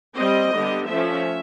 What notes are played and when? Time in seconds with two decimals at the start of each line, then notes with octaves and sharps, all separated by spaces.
0.17 G3 C4 D#5
0.53 D3 G3 B3
0.88 F3 A3 C#4 E5